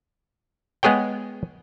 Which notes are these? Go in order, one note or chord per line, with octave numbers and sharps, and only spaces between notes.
G#3 B3 G#4 C#5 G5